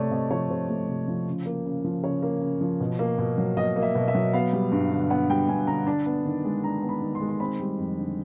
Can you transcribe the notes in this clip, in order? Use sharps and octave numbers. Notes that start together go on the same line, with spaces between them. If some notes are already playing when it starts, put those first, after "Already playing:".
Already playing: C3 A3 C#5 D5
C3 D#5
F3 C#5
C3 C5
A3
C3
F3
C#3
A#3
C#3
F3
C#3 C#5
A#3
C#3
F3
B2
A#3
B2
F#3
B2 D#5
A#3
E5
B2
E5
F#3
B3 F5
G3
G2
D3
B3 F#5
G3 G5
G2 G#5
D3 A#5
D4 A5
B3
D#3
G#3
D4 A#5
B3
B5
D#3
C6
G#3
C6
C4 B5
G3
F2
D3